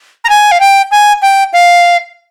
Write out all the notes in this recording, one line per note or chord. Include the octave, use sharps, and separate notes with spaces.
A#5
G#5
F5
G5
G#5
G5
F5